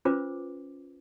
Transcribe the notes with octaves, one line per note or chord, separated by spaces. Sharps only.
C#4 F4 B4 C5 D6